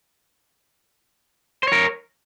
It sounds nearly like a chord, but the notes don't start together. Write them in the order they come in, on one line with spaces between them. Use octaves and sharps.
C5 C#5 A#4